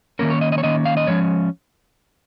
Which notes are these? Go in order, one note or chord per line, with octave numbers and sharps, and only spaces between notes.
D#3 A#3 C#4 A#4
C#5
D#5
D#5
C#5
D#3 A#3 C#4 D#5
F5
D#5
F3 G#3 C#4 C#5